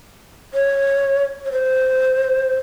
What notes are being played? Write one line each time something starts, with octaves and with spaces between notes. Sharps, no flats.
C#5
C#5
C5